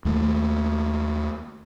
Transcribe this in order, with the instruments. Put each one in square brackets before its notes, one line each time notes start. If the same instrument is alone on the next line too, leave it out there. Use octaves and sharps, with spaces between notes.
[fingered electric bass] D#2 A3